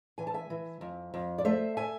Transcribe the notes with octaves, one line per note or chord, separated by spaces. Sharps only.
E3 G#5
A5
E5 G#5
E3
F2
F2
D5
A3 C5 E5
E5 G#5